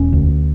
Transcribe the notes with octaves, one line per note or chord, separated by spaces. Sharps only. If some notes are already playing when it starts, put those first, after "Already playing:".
Already playing: E1 C#4
D2